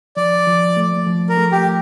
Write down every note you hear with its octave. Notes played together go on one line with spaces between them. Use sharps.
F3 D5
F3
A3
F3
A#4
A3
G4